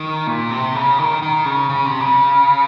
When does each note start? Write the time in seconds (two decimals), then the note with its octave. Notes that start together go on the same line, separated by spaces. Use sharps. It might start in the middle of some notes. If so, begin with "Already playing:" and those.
Already playing: D#3
0.27 A#2
0.51 C3
0.75 C#3
0.99 D#3
1.22 D#3
1.45 C#3
1.70 C#3
1.85 C3
2.01 C#3